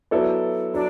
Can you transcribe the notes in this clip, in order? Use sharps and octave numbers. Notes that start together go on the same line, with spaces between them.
F#3 B3 E4 A4 D5
F#3 D4 D5